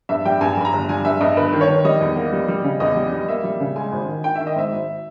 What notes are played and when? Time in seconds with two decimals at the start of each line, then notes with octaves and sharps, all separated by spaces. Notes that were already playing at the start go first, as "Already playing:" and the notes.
0.09 G2 E5
0.25 G3 G5
0.41 G2 G#5
0.57 G2 B5
0.65 A#5
0.73 G1
0.89 G3 G#5
1.05 G2 E5
1.21 G2 D#5
1.37 G1 B4
1.53 D#3
1.61 C#5
1.69 D#3
1.84 G3 D#5
2.01 E2
2.16 A#3
2.33 G3
2.48 G3
2.64 C#3
2.80 E2 D#5
2.96 G3
3.12 G3
3.28 A#3 E5
3.44 G3
3.60 C#3
3.76 G#3 G#5
3.92 G#1
4.08 D#3
4.24 D#3 G5
4.36 D#3 E5
4.47 D#5
4.56 G#2 E5
4.72 G#1